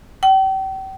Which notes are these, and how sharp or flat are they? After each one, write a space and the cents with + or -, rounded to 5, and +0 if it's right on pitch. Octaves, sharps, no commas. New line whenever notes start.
G5 -40